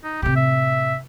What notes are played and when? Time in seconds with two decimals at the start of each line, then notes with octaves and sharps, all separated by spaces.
0.04 D#4
0.22 A2 C3 G4
0.36 E5